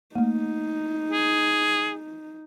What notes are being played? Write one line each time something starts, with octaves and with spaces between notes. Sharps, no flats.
A3 A#3 D#4
G#4